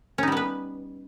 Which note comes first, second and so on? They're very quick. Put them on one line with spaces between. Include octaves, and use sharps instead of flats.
C#4 D#4 G3 B3 B4